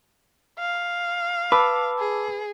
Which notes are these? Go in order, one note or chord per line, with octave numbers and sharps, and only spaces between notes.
F5
B4 A5 D6 E6
G#4